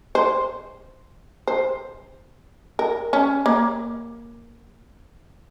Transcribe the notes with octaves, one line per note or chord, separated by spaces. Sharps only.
C5
C5
A#4
C#4
A#3